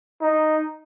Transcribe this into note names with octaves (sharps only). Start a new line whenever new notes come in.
D#4